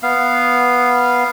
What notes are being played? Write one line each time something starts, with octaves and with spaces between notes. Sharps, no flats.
B3 F5